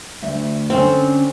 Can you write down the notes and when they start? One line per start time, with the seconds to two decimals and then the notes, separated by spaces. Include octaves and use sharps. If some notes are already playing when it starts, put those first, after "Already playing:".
0.22 D2 E5
0.70 D3 C4 C#4